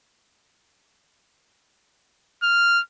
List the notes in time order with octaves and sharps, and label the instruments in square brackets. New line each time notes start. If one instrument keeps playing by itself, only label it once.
[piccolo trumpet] F6